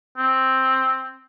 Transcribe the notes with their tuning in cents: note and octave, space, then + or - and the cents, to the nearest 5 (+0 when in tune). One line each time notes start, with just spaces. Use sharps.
C4 +5